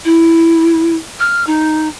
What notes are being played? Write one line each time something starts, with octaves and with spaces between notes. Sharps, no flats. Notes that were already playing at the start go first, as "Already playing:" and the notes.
E4
F6
D#4